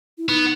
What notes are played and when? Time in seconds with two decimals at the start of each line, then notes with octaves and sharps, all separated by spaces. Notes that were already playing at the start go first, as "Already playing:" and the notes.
0.18 E4
0.29 B3 D#4